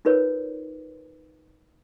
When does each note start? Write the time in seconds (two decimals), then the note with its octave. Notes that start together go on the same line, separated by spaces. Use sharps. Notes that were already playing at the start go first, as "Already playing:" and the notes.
0.05 D#4 F4 A#4 B4 C#5